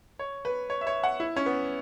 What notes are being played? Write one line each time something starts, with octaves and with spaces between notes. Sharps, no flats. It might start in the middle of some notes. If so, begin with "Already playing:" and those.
C#5
B4
C#5
E5
C#5
F#5
E4
C#4
B3